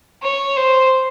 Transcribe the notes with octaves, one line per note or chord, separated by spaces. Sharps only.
C#5
C5